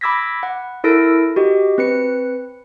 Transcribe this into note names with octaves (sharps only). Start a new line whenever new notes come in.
B5 D6 E6 G#6 A#6 B6
F#5
E4 A4 A#4 E6 A#6 D7
F#4 G4 D#5
C4 B4 C#7